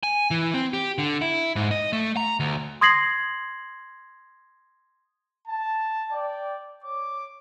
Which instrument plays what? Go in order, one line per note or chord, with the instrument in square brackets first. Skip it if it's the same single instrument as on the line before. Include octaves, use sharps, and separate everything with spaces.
[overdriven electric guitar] G#5
E3
C4
G4
D3
E4
G#2
D#5
A3
A#5
D2
[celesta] C6 D#6 G#6 A#6 C7 F#7
[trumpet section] A5
D5 G5
C#5 D6